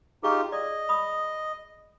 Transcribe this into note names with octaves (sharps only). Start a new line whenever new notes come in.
D#4 F4 G4 G#4 C#6
D5 D#5
B5 D#6